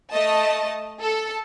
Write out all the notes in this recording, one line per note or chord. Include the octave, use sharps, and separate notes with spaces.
A3 D#5 A5
A4